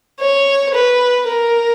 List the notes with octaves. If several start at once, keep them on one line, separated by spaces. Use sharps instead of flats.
C#5
B4
A#4